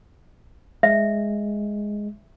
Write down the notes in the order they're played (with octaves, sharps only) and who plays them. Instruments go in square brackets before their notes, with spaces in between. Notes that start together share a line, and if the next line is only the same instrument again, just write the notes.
[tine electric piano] G#3 [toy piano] E5